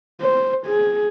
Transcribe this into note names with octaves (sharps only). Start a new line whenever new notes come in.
C5
G#4